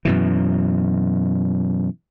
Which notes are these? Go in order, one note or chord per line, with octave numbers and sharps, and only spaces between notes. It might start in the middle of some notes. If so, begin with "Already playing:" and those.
F#2 B2 E3